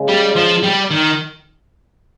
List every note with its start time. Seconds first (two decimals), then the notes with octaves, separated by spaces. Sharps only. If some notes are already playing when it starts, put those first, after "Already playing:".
Already playing: C#3 G#3
0.08 G3
0.36 F3
0.63 G3
0.91 D#3